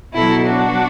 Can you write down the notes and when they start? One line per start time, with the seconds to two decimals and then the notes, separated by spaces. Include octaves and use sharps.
0.14 B2 F#3 E4 A4
0.46 D4 F#4